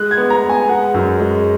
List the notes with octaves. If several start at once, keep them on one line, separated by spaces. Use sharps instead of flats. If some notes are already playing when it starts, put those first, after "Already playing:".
Already playing: G#3 F#6
G#6
B3
A#5
B3
G#5
G#3 F#5
F#2
G#3